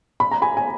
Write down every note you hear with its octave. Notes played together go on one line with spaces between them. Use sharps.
B5
A#5
G#5 B5
G#5